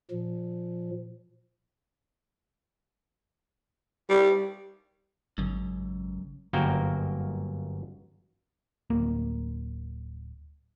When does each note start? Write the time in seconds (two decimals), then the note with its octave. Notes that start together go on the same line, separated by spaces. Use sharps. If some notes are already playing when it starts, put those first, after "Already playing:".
0.11 A#2 F3
4.10 G3
5.38 G#1 C#2 F#2
6.53 G1 F#2 A#3 F#4 A#4 G5
8.90 D1 A#3